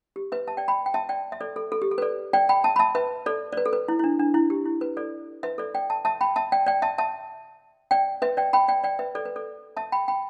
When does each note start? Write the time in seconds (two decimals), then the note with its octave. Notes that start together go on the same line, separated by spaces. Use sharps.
0.16 G4
0.32 B4 E5
0.47 E5 A5
0.57 D5 G5
0.68 G5 B5
0.86 G5
0.94 E5 A5
1.09 D5 G5
1.32 E5
1.41 A4 D5
1.56 A4
1.72 A4
1.82 G4
1.91 A4
1.98 B4
2.02 A4 D5
2.33 D5 G5
2.49 G5 B5
2.64 E5 A5
2.76 B5
2.79 E5 A5
2.95 B4 E5
3.26 A4 D5
3.52 D5
3.57 B4
3.65 A4
3.73 B4
3.88 E4
3.99 E4
4.04 D4
4.19 D4
4.34 E4
4.50 G4
4.66 E4
4.81 B4
4.97 A4 D5
5.43 B4 E5
5.58 A4 D5
5.75 D5 G5
5.90 E5 A5
6.05 E5 A5
6.21 G5 B5
6.36 E5 A5
6.52 D5 G5
6.67 D5 G5
6.82 E5 A5
6.98 E5 A5
7.91 D5 G5
8.22 B4 E5
8.37 D5 G5
8.53 G5 B5
8.68 D5 G5
8.84 D5 G5
8.99 B4 E5
9.15 A4 D5
9.25 B4
9.36 A4 D5
9.77 E5 A5
9.92 G5 B5
10.08 G5 B5